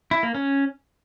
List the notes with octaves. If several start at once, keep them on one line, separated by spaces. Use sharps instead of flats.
E4
A#3
C#4